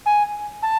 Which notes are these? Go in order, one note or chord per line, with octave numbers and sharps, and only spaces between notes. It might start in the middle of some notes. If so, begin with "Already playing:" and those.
G#5
A5